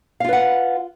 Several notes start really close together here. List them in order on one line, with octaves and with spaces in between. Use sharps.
F5 F4 B4 F#5